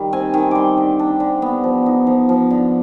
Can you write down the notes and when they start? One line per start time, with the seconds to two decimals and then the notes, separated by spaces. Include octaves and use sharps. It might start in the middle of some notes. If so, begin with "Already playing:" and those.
Already playing: D#3 G3
0.13 C4 G#5
0.34 D#3
0.51 G3 C6 D6
0.77 D3
0.99 D4
1.20 D3
1.42 B3
1.64 F3
1.86 D#4
2.07 F3
2.29 F3
2.50 D3